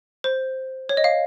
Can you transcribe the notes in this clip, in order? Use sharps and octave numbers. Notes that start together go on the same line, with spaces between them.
C5
C#5
D#5
F5